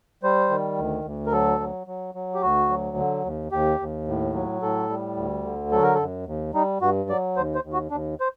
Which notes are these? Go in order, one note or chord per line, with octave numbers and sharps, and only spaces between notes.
G3 C5
D#3
D2
D2
A#4
F#3 A4
F#3
F#3
F#3
G4
D2 F#4
F#3
D3
D#2
D#2 G4
D#2
A2
F#3
A2 A4
G3
D2
D3
F#3 A4
A#4
A4
F#2
D#2
G3 D#4
G2 F#4
F#3 D5
D#2 C5
C5
D#2
F#4
D#2 D4
C5